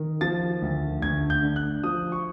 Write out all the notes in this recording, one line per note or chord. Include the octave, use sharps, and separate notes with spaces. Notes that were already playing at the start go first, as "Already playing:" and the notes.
Already playing: D#3
F3 A6
D2
D2 G#6
G6
D3
F#6
F3 D#6
C#6